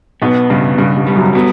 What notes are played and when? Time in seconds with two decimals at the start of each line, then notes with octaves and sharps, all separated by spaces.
0.22 B1 B2 B3
0.50 G2 C#3
0.78 G2 C#3
0.97 G2
1.07 G3
1.16 F#2 F#3
1.35 F#3 B3